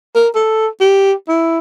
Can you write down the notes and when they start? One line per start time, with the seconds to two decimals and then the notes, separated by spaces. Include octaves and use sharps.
0.15 A#4
0.35 A4
0.81 G4
1.28 E4